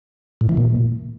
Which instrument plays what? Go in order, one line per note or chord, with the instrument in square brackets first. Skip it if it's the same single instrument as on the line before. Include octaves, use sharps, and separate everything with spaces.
[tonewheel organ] A2
E3
A#2